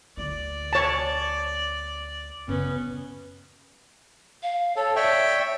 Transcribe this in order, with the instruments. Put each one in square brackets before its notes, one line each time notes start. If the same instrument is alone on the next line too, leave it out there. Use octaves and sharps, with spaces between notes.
[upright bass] D2 E4 [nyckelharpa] D5
[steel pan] C#5 A5
[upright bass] F#2 C#3 [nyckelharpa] B3 C#4
[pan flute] F5
[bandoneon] A4 [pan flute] C#5
[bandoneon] C#5 E5 G5 [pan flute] D5